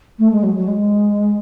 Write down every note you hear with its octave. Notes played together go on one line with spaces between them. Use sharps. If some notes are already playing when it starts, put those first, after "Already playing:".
A3
G#3
F#3
F#3
G#3